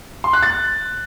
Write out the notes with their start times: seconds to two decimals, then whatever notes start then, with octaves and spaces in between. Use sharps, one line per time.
0.24 C6
0.33 F#6
0.43 A6